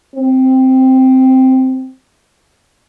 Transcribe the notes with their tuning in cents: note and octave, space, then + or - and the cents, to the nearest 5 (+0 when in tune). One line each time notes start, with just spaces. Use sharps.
C4 -5